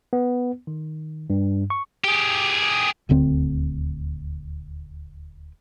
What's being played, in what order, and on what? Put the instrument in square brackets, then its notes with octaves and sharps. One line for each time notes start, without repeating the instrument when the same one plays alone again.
[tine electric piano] B3
D#3
G2
C#6
[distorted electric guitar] G4 G#4
[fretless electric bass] D#1 D2 D3 C4